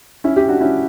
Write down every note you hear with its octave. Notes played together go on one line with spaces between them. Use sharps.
C#4 E4
E4 G4
D4 F#4
C#4 E4